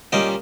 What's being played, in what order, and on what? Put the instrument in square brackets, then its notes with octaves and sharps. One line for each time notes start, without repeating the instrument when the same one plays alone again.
[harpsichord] A#2 G3 C#4 D#5 G5